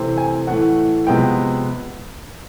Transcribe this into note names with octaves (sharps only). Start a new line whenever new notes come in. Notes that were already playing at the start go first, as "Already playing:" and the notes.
Already playing: C3 E3 A3 C4
G#5
A2 E3 A3 F#5
C3 F3 G#3 B3 G5